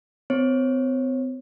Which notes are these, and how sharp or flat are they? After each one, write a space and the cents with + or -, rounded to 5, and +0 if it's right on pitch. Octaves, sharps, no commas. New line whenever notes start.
C4 -45 C#5 -30